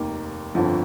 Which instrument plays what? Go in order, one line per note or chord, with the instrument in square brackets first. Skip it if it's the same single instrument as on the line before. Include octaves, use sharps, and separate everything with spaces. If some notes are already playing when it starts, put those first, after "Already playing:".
Already playing: [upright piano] F1 D#2 D#3 A#3
G1 F2 D3 F3